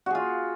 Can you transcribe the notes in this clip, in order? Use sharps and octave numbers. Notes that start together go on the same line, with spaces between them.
F4 F#4 G#4